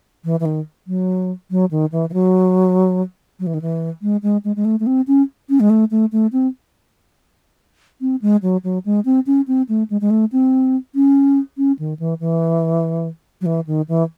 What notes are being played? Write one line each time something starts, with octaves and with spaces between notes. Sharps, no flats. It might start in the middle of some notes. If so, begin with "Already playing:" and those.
E3
E3
D#3
F#3
F#3
D#3
E3
E3
F#3
F#3
E3
D#3
E3
G#3
G#3
G#3
G#3
A3
A3
C4
C#4
C#4
G#3
A3
A3
A3
C4
C4
G#3
F#3
F#3
G#3
C4
C#4
C4
A3
G#3
G#3
A3
C4
C#4
C#4
D#3
E3
E3
F#3
E3
D#3
E3